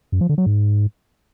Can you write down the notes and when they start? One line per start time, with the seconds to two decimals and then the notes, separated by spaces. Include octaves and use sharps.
0.12 F#2
0.21 F3
0.29 D3
0.38 F#3
0.46 G#2